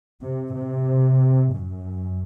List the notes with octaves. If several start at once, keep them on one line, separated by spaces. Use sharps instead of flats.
C3
C3
F#2